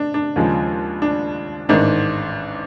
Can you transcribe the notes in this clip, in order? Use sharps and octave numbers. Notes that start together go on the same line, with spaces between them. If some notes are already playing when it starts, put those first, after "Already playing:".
Already playing: D4
D4
D#2 C#3 F3 G#3
D4
A1 G#2 D#3 D4